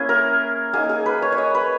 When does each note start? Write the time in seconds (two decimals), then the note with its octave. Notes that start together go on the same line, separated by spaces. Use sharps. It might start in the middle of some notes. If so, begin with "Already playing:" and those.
Already playing: A#3 C#4 E4 G#4
0.09 A#4
0.73 A#3 D#4 G#4
0.89 G#4
1.06 B4
1.22 C#5
1.32 C#5
1.38 D#5
1.55 B4